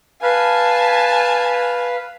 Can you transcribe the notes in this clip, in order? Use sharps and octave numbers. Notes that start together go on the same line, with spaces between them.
B4 F5 G#5 A5